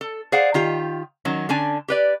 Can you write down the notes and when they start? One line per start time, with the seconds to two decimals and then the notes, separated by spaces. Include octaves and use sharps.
0.01 A4
0.32 G#4 C5 D5 F5 F#5
0.54 D#3 F4 G4
1.25 D#3 F#3 C#4
1.49 D3 C#4 D4 G#5
1.88 G4 B4 D5